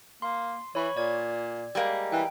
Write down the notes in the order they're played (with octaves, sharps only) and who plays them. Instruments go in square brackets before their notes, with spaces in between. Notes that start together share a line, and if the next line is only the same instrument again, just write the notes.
[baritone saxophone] A#3 [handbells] C6
[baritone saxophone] E3 [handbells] C#5 B5 C#6
[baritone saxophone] A#2 [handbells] D5 G#6
[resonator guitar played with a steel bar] G3 G#3 A#3
[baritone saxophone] E3 [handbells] G5